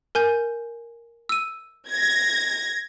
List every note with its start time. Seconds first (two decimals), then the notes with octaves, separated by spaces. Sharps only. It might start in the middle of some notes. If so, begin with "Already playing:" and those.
0.15 A#4 G#5 G6
1.29 E6 D#7
1.90 G#6 A#6